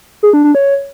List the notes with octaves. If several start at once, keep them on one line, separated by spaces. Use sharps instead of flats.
G#4
D4
D4
C#5